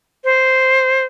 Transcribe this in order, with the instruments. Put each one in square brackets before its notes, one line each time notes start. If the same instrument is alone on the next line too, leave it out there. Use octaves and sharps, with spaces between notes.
[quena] C5